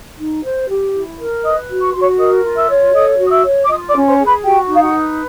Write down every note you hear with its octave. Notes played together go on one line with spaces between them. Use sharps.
D#4
C5
G4
E4
A#4
B4 D#5 D#6
F#4
C#6
F#4 C6
C#5 C#6
A#4 D#5 D#6
F4
E5 E6
C#5
A4 D#5 D#6
F#4
D#6
E5 E6
C#5
D6
F4 D#5 D#6
D5 D6
C#4
C5 C6
G#4
B4 B5
F#4 G4 G5
D#4 F5
F#4 F#5
B4